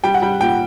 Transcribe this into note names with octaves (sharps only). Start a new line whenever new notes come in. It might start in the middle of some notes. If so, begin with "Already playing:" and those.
G3 G5
F#5
G3 G5
A#2 G5